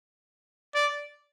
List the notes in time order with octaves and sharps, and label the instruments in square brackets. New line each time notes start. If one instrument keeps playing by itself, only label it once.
[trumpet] D5